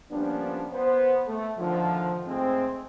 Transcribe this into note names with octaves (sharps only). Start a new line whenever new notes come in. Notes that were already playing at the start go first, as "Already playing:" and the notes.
F3 G3 A#3 B3 C#4 D4
B3 C5
A3
A2 D3 D#3 F3
G#2 G#3 A3 C4